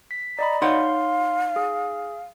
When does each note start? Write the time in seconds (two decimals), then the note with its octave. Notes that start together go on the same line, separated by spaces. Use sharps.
0.11 B6
0.39 D5 D#5 A#5 B5
0.62 D#4 C#5 F5 F#5 C6
1.56 G#4